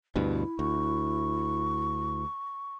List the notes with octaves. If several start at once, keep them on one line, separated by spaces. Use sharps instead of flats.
D2 G2 B2 E4
D2 C#6